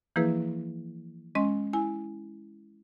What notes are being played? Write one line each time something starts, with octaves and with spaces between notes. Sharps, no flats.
E3 F3 A#3 E4 G#4 B4
G#3 C#4 D#5 C6
E4 G#5